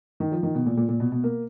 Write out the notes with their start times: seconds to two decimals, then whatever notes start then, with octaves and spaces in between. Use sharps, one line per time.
0.20 D#3
0.32 F3
0.43 D#3
0.55 B2
0.66 A#2
0.77 A#2
0.88 A#2
1.00 B2
1.12 B2
1.24 A#3